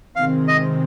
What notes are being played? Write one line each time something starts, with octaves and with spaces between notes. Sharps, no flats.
C3 D#3 G#3 C4 F5
D#5